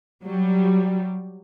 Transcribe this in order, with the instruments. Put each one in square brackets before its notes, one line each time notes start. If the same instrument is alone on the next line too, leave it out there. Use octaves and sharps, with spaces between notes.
[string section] F#3 G3